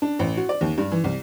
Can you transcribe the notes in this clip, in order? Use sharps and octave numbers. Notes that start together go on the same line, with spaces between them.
D4
A1
F#4
D5
D#2
G2
E3
C2